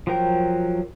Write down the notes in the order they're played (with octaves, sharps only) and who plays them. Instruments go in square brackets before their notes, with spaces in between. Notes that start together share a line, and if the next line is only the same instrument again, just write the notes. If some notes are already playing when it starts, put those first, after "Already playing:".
[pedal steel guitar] F3 F#3 A#4 G5